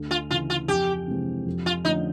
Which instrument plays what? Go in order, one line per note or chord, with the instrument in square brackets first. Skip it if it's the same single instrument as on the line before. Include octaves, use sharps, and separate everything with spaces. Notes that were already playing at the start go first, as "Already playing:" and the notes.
Already playing: [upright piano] D2
[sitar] F4
[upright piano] C#3 E3 [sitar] F4
[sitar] F4
[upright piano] F2 [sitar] G4
[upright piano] C3 E3 G#3 C4
F2
[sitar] F4
[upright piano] D3 F3 A3 C#4 [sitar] D#4